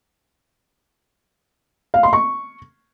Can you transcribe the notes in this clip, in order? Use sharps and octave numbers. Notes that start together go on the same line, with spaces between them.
F5
C6
C#6